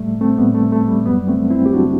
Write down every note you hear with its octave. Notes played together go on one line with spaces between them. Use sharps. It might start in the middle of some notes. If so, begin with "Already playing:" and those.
Already playing: A2 G3 A3
A3 C4
A2 G3 B3
A3
A3
G3
F#2 F#3 G3 B3
A3 C4
C4 E4
G4
F#3 D4 F#4